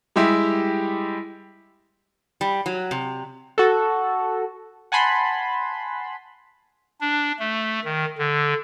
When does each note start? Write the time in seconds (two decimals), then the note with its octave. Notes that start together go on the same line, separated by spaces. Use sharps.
0.16 G3 G#3 E4 G4
2.41 G3
2.66 F#3
2.91 C3
3.58 F#4 A4
4.92 F#5 G#5 A5 B5 C6
7.01 D4
7.39 A3
7.85 D#3
8.18 D3